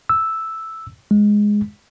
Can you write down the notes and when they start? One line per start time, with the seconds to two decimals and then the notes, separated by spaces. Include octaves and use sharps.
0.09 E6
1.11 G#3